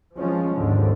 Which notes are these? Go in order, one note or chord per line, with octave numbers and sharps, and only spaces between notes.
F3 G#3 C#4
D#2 G#2 D3